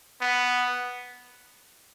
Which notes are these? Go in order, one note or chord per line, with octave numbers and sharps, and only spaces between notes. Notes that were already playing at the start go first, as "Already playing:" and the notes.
B3